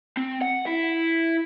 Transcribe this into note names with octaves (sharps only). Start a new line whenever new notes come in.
C4
F#5
E4